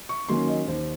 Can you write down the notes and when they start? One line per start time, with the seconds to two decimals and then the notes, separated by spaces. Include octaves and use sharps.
0.09 C#6
0.29 D#3 F#3 A#3 C#4 C6
0.47 D#5
0.67 D#2 C5